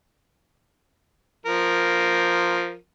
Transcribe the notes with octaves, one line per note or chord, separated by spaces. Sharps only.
F3 A#4